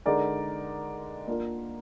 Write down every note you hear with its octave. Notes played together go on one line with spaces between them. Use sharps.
D3 G#3 D#4 A#4 D5
A#3 D4 F4 A#4